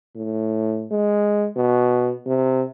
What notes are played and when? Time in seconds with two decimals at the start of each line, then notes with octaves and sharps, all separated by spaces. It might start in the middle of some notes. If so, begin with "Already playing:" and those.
0.16 A2
0.92 G#3
1.56 B2
2.26 C3